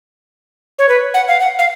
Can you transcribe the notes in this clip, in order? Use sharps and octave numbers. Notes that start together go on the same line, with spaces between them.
C#5
B4
F#5
F5
F#5
F5